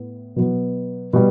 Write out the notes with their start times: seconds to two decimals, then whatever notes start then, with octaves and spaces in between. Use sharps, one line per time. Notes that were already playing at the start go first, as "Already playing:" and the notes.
Already playing: A2 B3
0.36 B2 F#3 B3
1.13 B2 G3